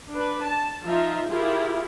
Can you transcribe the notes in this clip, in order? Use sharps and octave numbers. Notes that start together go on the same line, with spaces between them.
D4 B4
A5
F3 D#4 F4 E5 A#5
E4 F4 G4 G#4 A#4